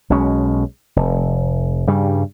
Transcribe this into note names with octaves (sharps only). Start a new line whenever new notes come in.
B1 B2 G#3 C#4
F1
G2 C#3 G3